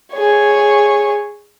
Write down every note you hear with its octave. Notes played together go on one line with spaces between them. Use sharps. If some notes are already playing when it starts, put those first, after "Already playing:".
G#4 C#5